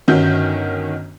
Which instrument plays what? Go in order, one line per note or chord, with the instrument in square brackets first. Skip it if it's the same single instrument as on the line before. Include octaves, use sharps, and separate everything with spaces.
[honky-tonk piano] G1 D#3 C#4 F#4 G6